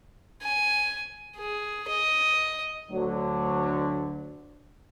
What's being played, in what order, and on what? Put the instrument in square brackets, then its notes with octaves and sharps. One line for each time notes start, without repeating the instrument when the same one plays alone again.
[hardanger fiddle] G#5
G#4
D#5
[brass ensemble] D2 D3 F#3